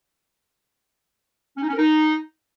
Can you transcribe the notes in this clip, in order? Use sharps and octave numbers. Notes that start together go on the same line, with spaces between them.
C#4
D#4
C#4
A#4
D#4